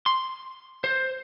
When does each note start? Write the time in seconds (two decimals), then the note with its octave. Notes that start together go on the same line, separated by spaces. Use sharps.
0.06 C6
0.84 C5